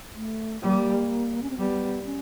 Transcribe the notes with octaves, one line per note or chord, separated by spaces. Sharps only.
A3
G3 A#3
C#4
C4
G3 B3
C#4